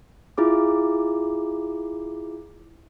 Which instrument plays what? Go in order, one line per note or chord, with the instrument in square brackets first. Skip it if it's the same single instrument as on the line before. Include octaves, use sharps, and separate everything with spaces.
[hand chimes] E4 F4 G#4 D6